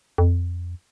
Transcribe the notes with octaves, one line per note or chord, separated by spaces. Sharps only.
F2